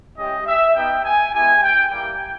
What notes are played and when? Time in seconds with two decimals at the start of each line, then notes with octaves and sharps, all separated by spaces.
0.17 G#3 C#4 E4 G4 D#5
0.46 E5
0.75 B3 D#4 G4 G5
1.04 G#5
1.34 G#3 B3 E4 G4 G#5
1.63 G5
1.91 G3 A#3 E4 G4 G5